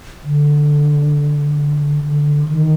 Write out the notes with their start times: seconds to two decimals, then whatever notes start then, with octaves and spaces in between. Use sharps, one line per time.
0.23 D3
2.04 D3
2.48 D#3